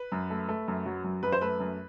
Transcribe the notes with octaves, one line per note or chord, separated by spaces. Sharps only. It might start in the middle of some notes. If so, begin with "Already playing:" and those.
Already playing: B4
F#2
A3
A3
F#2
F#3
F#2
F#2 B4
C5
A3 B4
F#2